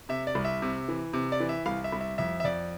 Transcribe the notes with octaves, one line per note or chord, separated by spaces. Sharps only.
C3 E5
D5
C2
E5
C3
E3
C3
D5
E3
E5
C2 F5
E5
C2
E5
F2 E5
E5
F2 D5